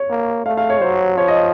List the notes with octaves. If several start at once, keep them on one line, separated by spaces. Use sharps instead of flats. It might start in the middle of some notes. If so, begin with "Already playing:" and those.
Already playing: C#5
A#3
A3 F5
F5
C#5
F#3 C5
F3 C#5
D#5